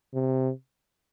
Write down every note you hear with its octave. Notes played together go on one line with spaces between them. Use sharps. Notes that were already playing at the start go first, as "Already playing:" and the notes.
C3